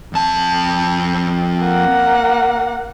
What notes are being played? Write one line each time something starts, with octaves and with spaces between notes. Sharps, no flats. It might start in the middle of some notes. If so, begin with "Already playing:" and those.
F2 A5
A#3 F#5